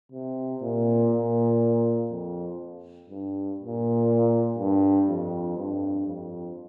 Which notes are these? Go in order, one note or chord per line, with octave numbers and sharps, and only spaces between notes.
C3
A#2
A#2
F2
G2
A#2
G2
F2
G2
F2